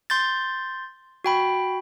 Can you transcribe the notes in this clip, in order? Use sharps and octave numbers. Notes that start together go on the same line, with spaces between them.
C6 G6 A6
F#4 G5 B5